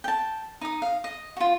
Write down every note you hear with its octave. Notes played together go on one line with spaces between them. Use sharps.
G5 A5
D#4 D#6
F5
D#5
F4 F#4